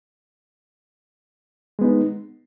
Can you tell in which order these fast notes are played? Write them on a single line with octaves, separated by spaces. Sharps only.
G#3 B3 D#4